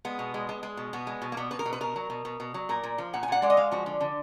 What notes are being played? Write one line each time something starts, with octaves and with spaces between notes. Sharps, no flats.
G#3 B3
B2
G#3
G#3
G#3
B2
B2 B3
G#3
B2
A#3
B2 B3
B2 B4
A#4
B2
B4
B2 A#4
F#3
B2
B2
B2
F#3
A#2 A#4
A#2
F3
A#2 F#5
G#5
A#2 F#5
G#3 D5
D#5
G#3 F5
F3 F#4
D3
D3